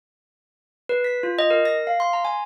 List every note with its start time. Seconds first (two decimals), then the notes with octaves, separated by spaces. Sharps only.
0.89 B4
1.04 B6
1.23 F4
1.39 D#5
1.50 A#4
1.65 A#6
1.87 F5
2.00 C6
2.13 A#5
2.25 G#5